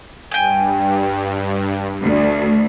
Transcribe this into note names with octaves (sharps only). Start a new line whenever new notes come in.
G2 G5 G#5
D2